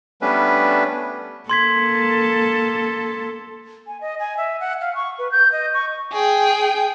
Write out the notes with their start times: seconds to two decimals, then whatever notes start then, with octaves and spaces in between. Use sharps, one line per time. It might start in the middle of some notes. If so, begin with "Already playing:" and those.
0.22 G3 A3 B3 C#4 D4 B4
1.49 A#3 A4 C6 G#6 B6
3.87 G#5
4.01 D#5
4.20 G#5
4.37 E5
4.60 F#5
4.81 F5
4.95 C#6
5.19 B4
5.32 G6
5.52 D#5
5.74 C#6
6.13 G#4 G5